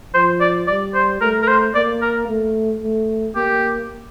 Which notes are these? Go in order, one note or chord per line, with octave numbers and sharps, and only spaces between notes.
F3 C5
D5
G3 D5
C5
A3 A#4
A#4
C5
A#3 D5
A#4
A3
A3
A#3 G4